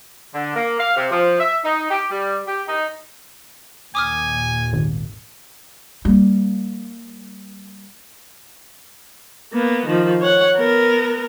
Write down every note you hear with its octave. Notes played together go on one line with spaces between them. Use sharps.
D3
A#3
F5
C3
F3
E5
D#4
G4
G3
G4
D#4
D#2 A#2 G#5 D6 D#6 F6
G#1
G3 A#3
A#3 B3
D#3 F3
C#5 F#5
B3 A#4